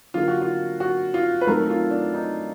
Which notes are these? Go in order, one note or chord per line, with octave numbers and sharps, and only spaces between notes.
D3 F#3 A#3 D4 F4
F#4
F4
F#4
F4
B4
D#3 F#3 A3 C4 A#4
F4
D4
D#4